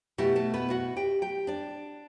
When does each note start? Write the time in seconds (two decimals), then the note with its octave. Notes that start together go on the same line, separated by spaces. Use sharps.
0.18 B2 A3 E4 G4
0.36 A3 A4
0.54 B3 B4
0.70 F#4 F#5
0.96 G4 G5
1.22 G4 G5
1.47 D4 D5